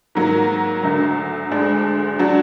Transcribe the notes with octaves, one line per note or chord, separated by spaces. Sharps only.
G#2 D#3 F#3 A#3
D2 D3 F#3
D2 D3 G#3 D4
F#3 D4 F#4